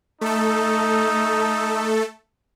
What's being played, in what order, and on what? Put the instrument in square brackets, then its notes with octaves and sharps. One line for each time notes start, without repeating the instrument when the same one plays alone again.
[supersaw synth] A3 A4 [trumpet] D#4